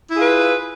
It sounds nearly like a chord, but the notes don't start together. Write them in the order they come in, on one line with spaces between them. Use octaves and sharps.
E4 G#4 F4 B4